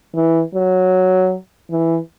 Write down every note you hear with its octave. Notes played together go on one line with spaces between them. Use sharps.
E3
F#3
E3